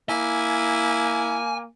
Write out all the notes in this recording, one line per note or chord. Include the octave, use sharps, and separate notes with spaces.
A#3 E4 G#5